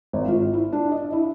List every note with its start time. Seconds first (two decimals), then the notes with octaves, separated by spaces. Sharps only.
0.13 G#1
0.28 F4
0.53 E4
0.73 D4
0.92 D#5
1.12 E4